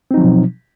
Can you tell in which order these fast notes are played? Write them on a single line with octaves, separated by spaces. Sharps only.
C4 D#4 F#3 F3 B2